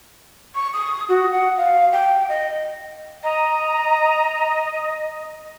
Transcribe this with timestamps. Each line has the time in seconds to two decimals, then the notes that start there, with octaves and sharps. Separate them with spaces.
0.55 C#6
0.74 D#6
1.09 F#4
1.31 F#5
1.58 F5
1.92 G5
2.29 D#5
3.23 D#5 A#5